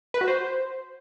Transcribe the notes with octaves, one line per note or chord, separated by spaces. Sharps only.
B4
F#4
C5